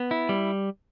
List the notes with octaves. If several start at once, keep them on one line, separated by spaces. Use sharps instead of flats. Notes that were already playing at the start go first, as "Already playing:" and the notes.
Already playing: B3
E4
G3